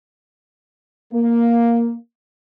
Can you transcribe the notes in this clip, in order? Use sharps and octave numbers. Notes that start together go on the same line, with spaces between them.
A#3